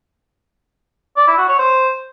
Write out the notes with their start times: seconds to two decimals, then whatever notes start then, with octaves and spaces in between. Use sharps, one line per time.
1.17 D5
1.27 E4
1.38 F#4
1.48 C#5
1.59 C5